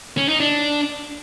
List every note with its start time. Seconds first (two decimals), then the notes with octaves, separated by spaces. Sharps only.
0.17 C#4
0.29 D#4
0.40 D4